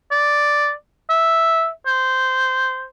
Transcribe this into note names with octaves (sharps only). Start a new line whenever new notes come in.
D5
E5
C5